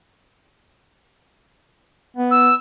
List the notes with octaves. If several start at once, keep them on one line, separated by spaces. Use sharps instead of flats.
B3
E6